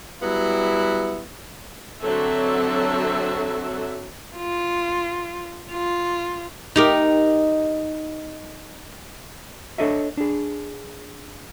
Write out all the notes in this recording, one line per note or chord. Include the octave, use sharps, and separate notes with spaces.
F#3 G3 B3 E4
D3 F#3 C4 F#4 A4 E5
F4
F4
D#4 G4 A#4
D4 A4 C#5 D#5 E5
D4 G#4